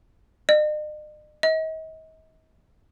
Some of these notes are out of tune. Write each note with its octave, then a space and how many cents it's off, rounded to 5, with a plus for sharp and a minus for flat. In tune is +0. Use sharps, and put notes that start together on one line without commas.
D#5 -45
D#5 +40